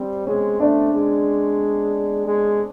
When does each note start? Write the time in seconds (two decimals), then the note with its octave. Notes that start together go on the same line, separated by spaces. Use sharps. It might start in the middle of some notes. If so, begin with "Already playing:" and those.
Already playing: G3 C4 C5
0.27 G#3 C#4 C#5
0.60 A3 D4 D5
0.94 G#3
2.26 G#3